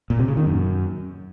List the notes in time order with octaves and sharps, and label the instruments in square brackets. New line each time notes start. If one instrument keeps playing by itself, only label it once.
[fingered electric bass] A#2
C3
C#3
D#3
F#2